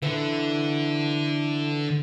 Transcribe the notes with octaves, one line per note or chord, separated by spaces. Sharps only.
D3 E3